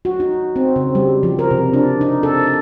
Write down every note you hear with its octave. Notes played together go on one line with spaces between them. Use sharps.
F#4
D#4
C4
C#3
G3
F3
A#4
C3
D4
D#4
A4